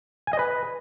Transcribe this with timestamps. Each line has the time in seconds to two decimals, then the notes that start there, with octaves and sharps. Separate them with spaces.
0.27 G#5
0.33 D#5
0.39 B4